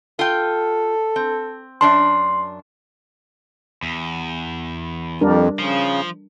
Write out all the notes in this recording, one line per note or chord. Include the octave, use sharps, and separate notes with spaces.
F4 A4 G5
C4
F#2 D4 A5 C6
E2
F2 G3 D4 A#4
C#3 F3